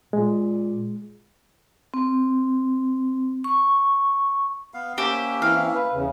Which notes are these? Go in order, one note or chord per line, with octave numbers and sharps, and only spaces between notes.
A#2 G#3
C4
C#6
B3 F5
A#3 C#4 G4 C5 E5
E3 C4 E4 F5
B4
E2 C#3